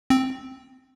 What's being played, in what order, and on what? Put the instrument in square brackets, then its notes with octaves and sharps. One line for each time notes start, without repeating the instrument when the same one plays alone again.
[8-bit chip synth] C4